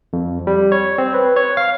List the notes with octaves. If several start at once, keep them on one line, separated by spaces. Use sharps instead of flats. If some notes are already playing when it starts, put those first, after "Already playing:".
F2
G3
C#5
C4
B4
C#5
F5